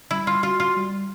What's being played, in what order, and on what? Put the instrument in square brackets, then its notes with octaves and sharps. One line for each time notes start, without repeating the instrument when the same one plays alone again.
[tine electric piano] G3 [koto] E4
[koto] F4
[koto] F4 [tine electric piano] F#4
[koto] F4
[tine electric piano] G3